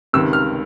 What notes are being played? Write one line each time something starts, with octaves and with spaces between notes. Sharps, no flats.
C#2 C3 D#3 E6
F6